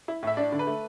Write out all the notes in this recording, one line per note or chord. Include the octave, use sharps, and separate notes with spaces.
E4
A2 E5
D4 D5
D3
B4
A3